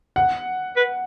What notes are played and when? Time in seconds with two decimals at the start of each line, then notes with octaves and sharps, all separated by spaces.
0.16 F#5
0.77 B4